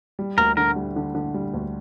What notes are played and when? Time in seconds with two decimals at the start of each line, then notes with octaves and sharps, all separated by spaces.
0.19 G3
0.38 D2 A#4
0.57 D3 A#4
0.76 G3
0.96 D3
1.15 D3
1.34 G3
1.54 D2